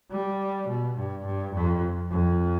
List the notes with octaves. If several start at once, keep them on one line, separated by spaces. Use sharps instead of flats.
G3
B2
G2
G2
F2
F2